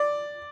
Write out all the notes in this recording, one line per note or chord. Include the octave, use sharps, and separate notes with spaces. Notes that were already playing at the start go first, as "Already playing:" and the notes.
Already playing: D5